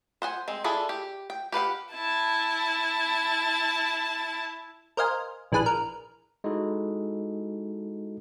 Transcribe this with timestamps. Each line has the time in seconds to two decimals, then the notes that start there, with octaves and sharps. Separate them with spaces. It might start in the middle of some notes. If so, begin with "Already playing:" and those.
0.22 C5 F#5 G#5
0.48 G#3 C4
0.64 D4 E4 F4 G#4 A4
0.89 G4
1.30 G5
1.52 G4 B4 F5 F#5
1.92 E4 A5
4.97 A#4 C5 D#5 F5 G#5
5.52 A#1 E3 D4 G#4 B4 F#6
5.66 A#4
6.44 G#3 D#4 E4 F#4 A4